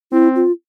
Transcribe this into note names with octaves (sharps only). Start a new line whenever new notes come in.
C4 E4
F4